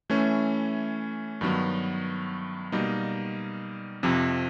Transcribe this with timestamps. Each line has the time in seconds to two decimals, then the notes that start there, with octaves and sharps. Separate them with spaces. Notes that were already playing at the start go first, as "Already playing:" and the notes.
0.10 E3 A3 C#4
1.41 G2 D#3 F#3 B3
2.72 B2 G3 A#3 D#4
4.03 F2 C3 F3